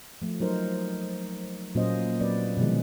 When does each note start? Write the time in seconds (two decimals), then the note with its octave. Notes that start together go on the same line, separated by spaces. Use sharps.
0.22 F3 A3
0.40 F#3 D#4 A#4 C5
1.75 A#2 F#3 A#3 C#4 C5 D#5
2.20 F#3 C4 B4 D5
2.57 B2 D3 D#3 F3 G#3